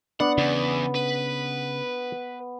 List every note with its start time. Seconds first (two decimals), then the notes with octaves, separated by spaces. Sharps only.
0.20 B3 D4 F#5
0.38 E2 C#3
0.95 B4